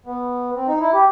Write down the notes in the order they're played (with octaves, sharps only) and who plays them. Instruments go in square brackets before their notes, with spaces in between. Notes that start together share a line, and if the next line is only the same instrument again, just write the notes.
[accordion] B3
C4
D#4
E4
G4